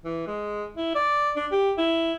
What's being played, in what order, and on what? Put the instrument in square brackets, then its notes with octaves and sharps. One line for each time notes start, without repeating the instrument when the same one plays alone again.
[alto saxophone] E3
G#3
E4
D5
D4
G4
E4